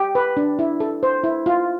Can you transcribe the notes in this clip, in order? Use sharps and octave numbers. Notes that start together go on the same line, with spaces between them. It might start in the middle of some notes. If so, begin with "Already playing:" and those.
Already playing: G4
B4
D4
E4
A4
C5
E4
F4